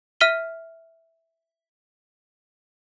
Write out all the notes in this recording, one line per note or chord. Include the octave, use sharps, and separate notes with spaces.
E5 F6 B6 D#7 G7